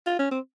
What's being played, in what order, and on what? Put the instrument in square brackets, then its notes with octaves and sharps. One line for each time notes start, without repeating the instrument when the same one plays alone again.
[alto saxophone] F4
C#4
C4